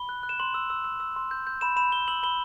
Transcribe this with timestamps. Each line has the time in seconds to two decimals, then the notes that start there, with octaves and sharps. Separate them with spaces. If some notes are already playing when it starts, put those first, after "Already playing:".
Already playing: B5 G7
0.09 F#6
0.23 F#6
0.29 E7
0.40 C6 F#7
0.54 E6
0.70 E6
0.85 E6
1.00 E6
1.16 C6
1.31 G6
1.47 G6
1.61 B5 E7
1.76 B5 E7
1.92 B5 G7
2.08 E6 F#7
2.23 B5 G7